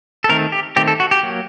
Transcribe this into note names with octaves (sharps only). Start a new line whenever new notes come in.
A4
D#3 A3 C4 A#4
G4
D#3 A3 C4 G4
A4
F#4
G4
F#3 A#3